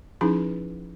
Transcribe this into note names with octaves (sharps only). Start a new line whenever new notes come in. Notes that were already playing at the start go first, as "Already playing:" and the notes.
F3 C#4 D#4 E4 G#4 B4